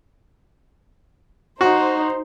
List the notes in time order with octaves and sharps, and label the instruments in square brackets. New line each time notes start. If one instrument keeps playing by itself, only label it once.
[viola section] D#4 C5 [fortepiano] F#4